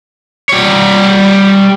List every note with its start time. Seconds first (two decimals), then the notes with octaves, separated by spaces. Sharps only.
0.49 G3 C#5